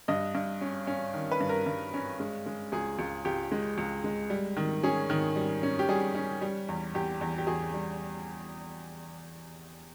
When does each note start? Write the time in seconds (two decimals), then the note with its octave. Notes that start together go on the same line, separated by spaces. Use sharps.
0.08 G2 D#5
0.35 G2
0.61 C#4
0.87 C#4
1.14 D#3
1.32 B4
1.41 G2
1.49 A#4
1.66 G2
1.94 C#4
2.20 G#3
2.46 G#3
2.72 C#2 G#4
2.99 C#2
3.25 C#2 G4
3.52 G#3
3.78 C#2
4.04 G#3
4.30 G3
4.57 D#3
4.83 C#4 G#4
5.10 D#3
5.36 G3
5.63 C#4
5.79 G4
5.89 G3 G#4
6.15 C#4
6.41 G3
6.69 E2
6.95 E2 G4
7.21 E2
7.38 G4
7.47 E2 G#4
7.74 G3